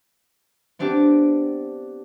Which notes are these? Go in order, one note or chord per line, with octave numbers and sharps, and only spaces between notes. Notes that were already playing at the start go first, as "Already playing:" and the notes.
B3 C4 D4 E4 G4